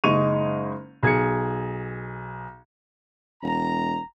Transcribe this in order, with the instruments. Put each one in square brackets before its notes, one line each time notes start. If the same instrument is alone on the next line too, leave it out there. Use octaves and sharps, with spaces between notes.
[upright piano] F#1 G#3 D#4 C#6 D#7 F7
B1 G#4 G#6 C#7
[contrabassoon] E1 [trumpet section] A#5